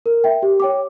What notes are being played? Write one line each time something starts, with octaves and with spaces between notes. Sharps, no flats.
A#4
E5 G5
G4
C#5 G5 D6